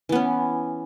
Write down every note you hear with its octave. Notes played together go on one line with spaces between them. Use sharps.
E3 B3 C#4